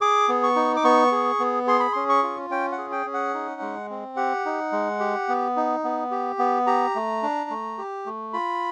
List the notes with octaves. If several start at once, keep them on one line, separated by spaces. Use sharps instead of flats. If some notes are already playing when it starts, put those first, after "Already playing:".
G#4 D6
B3
C#6
D#4
D6
B3 C#6
G#4
B3
G#4 C6
B5
C#4 C6
C#6
F4
C#4 G5
F#5
G#4
G5
C#4
F#5
D#4
G#3
C4
G4 F#5
D#4
G#3
G4
B3
D#4
B3
G4
B3
G4 A#5
A3
D4
A3
G4
A3
F4 B5